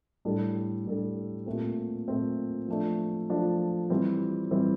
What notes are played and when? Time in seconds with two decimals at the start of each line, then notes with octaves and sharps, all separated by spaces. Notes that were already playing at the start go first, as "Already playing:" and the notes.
0.25 A2 G3 D4 A4
0.85 A2 G3 D4 A4
1.46 A#2 A3 C4
2.08 A#2 A3 C4
2.68 F3 A3 D4
3.30 F3 A3 D4
3.90 E3 G3 C4
4.51 E3 G3 C4